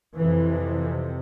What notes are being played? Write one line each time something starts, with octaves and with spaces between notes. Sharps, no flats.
F2 C3 E3